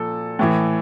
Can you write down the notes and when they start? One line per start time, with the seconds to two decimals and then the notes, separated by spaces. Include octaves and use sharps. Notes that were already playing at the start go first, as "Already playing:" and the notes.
Already playing: A#2 F3 A4
0.39 A2 E3